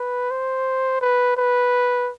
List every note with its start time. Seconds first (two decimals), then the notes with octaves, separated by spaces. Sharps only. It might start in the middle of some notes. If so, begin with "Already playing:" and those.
Already playing: B4
0.31 C5
1.01 B4
1.37 B4